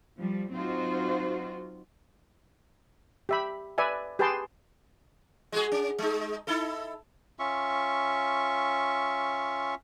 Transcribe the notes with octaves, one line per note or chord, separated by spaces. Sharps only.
F3 G3
F#3 C4 D#4 F4 F#4 C5
G4 E5 B5
B4 D5 E5 G#5
G4 G#4 B4 G5 A5 C6
G#3 F#4 G#4
C#4
G#3 D#4
D#4 E4 A4
C#4 F4 E5 C#6